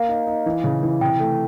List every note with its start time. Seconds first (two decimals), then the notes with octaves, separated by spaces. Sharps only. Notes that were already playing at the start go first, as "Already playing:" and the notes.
Already playing: A#3 F5
0.09 D#4
0.27 D#4
0.46 E3
0.64 C#3
0.83 E3
1.01 C3 G5
1.20 A3